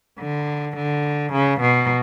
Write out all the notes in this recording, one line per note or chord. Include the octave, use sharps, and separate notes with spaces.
D3
D3
C#3
B2